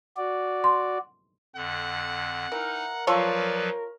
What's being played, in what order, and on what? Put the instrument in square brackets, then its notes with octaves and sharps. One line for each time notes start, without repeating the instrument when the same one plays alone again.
[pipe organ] F#4 D5
[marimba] C6
[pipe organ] F2 D3 [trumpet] F#5
[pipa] E3 [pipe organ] D#4 [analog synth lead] A#4
[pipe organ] F3 F#3 B4 [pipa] F4 A4 C#5 [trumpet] D5